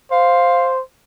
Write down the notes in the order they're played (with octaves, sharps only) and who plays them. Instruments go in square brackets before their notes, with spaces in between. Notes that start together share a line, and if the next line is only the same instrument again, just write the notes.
[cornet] C5 [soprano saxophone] F5